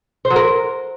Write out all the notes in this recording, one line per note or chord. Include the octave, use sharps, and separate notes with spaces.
C5
F#3
A#4